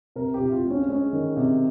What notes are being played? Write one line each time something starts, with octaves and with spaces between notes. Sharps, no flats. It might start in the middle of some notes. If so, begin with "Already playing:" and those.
C3 A#4
G4
C3
E4
F4
G#3
C#4
G#3 C#4
D#3
C3